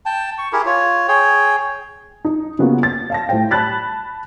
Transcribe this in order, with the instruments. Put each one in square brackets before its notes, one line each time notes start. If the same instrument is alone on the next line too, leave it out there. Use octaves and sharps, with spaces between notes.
[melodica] G5 A5
C#6
E4 G4 G#4 A#4
F4 C#5
G#4 C#5 G5
[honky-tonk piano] D#4
C#3 A#3 B3 F4 F#4
A6
F5 A5 A#6
A2 C5 G5
A5 B5 F#6 A6 B6